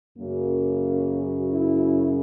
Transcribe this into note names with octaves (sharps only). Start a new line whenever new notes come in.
F#2 C#3 F#3 A#3
E4